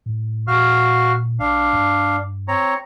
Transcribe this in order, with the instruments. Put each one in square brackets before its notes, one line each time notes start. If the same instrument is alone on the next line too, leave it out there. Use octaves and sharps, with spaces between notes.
[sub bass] A2
[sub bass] A#2 [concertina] F#4 F5 F6
[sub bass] B1 [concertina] D4 F5
[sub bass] G2
[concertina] C4 C#5 A#5